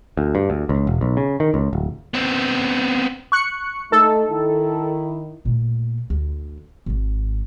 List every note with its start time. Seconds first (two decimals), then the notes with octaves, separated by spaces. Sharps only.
0.17 D2
0.35 G2
0.50 D2
0.69 C#2
0.87 E1
1.01 B1
1.17 C#3
1.40 D#3
1.54 C#2
1.73 D1
2.14 B3 C4
3.32 C#6 F#6 C#7
3.92 A3 D#4 A4
4.30 D#3 E4
5.45 A#2 A3
6.10 D2 D3
6.86 G#1 G#2